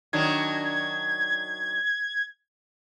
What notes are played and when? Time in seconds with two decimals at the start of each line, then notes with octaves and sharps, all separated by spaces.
0.13 D#3 F#3 D4 G#6